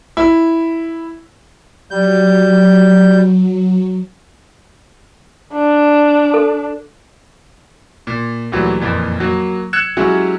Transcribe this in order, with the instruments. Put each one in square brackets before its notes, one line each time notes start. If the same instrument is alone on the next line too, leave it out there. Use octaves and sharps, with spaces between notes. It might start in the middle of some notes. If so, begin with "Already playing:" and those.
[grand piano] E4
[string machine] F#3 [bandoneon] G3 G6
[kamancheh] D4
[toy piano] A4
[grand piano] A#2
D2 A#2 E3 F#3 G3
F#1 F2 A#2 E3
F#3 A#3
E6 F#6 G#6 C#7 E7
F#3 G#3 C#4 E4 F#4 G4